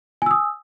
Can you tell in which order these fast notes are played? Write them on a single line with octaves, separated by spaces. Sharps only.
G#5 E6 D#6